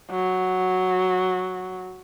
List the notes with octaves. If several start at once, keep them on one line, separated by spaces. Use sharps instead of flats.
F#3